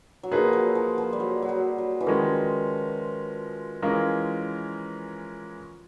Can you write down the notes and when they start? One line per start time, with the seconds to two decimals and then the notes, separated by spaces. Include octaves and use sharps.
0.23 F#3
0.32 F3 A#3 D#4 G#4 B4
0.53 F#3
0.75 F3
0.98 F3
1.13 G3
1.20 F#3
1.42 F#3
1.49 G3
1.78 F#3
2.00 E3
2.06 D#3 F3 G#3 C#4
3.82 E3 G#3 C#4 F4 A#4